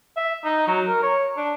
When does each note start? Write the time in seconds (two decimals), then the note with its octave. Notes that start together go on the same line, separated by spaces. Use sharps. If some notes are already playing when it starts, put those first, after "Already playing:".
0.17 E5
0.45 D#4
0.67 F#3
0.87 A#4
1.03 C#5
1.37 D4